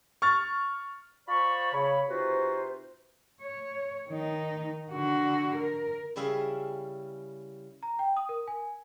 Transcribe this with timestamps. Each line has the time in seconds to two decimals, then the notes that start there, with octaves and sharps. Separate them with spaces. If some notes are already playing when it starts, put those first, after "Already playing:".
0.22 C#6 F6 A6
1.28 F4 C5 D5 A5 B5 C#6
1.73 C#3 C#5 B5
2.09 C3 D#4 F4 F#4 B4 C5
3.41 C#5
4.08 D#3 D#4
4.92 D3 F#4
5.56 A#4
6.16 C#3 G3 E4 G#4 E5 F5
7.83 A#5
7.99 G5
8.17 D#6
8.29 A#4
8.48 G#5